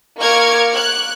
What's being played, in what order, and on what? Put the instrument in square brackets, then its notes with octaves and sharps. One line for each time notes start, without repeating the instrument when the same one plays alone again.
[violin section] A#3 A#4 C#6 D6 F6 G#6
F#6